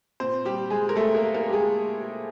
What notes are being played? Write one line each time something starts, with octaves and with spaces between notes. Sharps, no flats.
A#2 C4 C5
G3 G4
G#3 G#4
A#4
A3 A4
A#3 A#4
A#3 A#4
G4
G#3 G#4